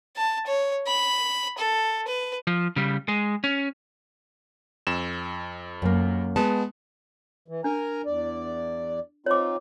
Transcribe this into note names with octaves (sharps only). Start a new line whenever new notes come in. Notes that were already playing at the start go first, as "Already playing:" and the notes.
A5
C#5
B5
A4
B4
F3
C#3 G3
G#3
C#4
F2 E7
F#2 A#3
G#3 B3 A5
E3
D4 A#4 G#5 A#5
E2 D5
C4 D#4 F4 C#5 D6